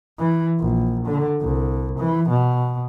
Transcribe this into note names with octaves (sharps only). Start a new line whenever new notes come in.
E3
A#1
D3
C2
E3
B2